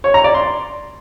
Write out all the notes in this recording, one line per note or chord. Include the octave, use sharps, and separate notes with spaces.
C#5
A#5
D5
C6